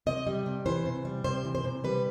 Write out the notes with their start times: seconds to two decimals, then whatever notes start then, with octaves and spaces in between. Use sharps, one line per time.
0.06 C3 D#5
0.27 G3
0.46 C3
0.66 E3 C5
0.85 C3
1.05 G3
1.24 C3 C5
1.45 E3
1.55 C5
1.64 C3
1.84 G3 B4